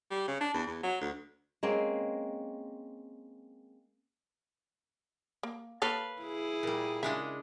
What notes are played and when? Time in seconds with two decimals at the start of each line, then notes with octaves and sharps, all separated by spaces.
0.11 G3
0.28 C#3
0.41 D4
0.54 E2
0.67 E2
0.83 F#3
1.01 D2
1.63 G#3 A#3 C4 C#4
5.43 A#3
5.82 A#3 A4 B4 C#5 F5
6.22 E4 G#4
6.63 A#2 G3
7.03 C#3 G#3 D4 E5 F5